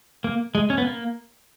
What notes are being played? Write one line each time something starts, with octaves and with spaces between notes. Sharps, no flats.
A#3
G#3
C#4
B3
A#3